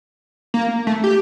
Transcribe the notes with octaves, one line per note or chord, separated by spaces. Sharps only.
A#3
A3
G4